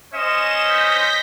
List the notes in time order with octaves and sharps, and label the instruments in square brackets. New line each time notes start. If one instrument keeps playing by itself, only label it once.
[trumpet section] C#4 C5 D#5 [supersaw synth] E7
[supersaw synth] G6 A#6 B6